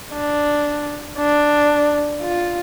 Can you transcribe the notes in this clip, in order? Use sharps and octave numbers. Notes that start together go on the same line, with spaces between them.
D4
D4
F4